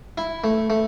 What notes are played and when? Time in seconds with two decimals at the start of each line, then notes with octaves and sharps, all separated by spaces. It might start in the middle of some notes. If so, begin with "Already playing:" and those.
0.18 E4
0.44 A3
0.70 A3